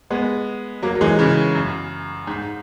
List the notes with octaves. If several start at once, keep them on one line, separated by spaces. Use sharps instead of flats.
G#3 B3
F#3 A#3
F#3
E3 G#3
C#3 E3
F#2
G#2